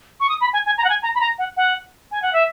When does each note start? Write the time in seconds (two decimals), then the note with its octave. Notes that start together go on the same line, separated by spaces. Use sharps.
0.20 C#6
0.29 D#6
0.41 B5
0.53 G#5
0.66 G#5
0.78 A#5
0.84 F#5
0.89 G#5
1.03 A#5
1.15 B5
1.20 A#5
1.38 F#5
1.57 F#5
2.11 G#5
2.22 F#5
2.33 E5